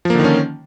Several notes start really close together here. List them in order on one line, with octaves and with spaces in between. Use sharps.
F3 A#3 D3 D#3 C#4